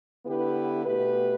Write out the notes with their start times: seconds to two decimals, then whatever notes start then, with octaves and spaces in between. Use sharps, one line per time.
0.25 D3 B3 E4 G4 B4
0.85 B2 A3 G4 B4